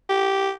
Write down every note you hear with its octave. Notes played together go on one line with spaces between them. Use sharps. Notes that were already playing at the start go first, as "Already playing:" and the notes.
G4